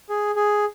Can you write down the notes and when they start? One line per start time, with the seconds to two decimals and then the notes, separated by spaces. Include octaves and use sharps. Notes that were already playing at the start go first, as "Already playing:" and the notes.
0.09 G#4
0.35 G#4